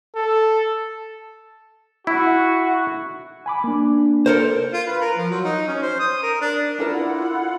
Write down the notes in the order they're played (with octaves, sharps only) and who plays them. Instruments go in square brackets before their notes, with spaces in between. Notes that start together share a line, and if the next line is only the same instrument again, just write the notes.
[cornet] A4
[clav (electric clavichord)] E4 [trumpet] F#4
[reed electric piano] G#5 B5 D6
A#3 D4
[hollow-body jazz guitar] A4 A#4 C5
[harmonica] F4
B4
A#4
F3
F#3
D#4
C#4
C5
D#6
A#4
D4
[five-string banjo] D4 A4 A#4 [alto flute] E4 [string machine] F4 F#5